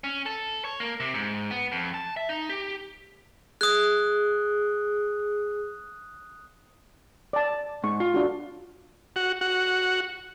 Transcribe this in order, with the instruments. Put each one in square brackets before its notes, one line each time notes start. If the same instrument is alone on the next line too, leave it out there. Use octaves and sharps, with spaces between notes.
[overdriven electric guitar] C#4
A4
C#5
A#3
C3
G#2
B3
F2
A5
E5
D#4
G4
[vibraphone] G#4 [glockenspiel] D#6 F#6
[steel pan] D5 A5
[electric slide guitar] G#2 [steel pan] C#6
[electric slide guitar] F4
[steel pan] D4 F#4
[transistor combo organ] F#4
F#4